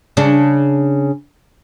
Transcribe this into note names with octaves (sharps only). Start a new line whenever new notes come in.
C#3 D4